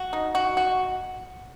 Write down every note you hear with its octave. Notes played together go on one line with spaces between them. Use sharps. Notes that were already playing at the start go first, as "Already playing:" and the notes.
Already playing: F#4
D#4
F#4
F#4